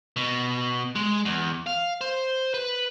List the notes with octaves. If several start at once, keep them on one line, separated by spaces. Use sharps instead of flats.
B2
G#3
E2
F5
C5
B4